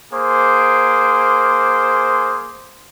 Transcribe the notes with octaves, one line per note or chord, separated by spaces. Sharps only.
A#3 G#4 C5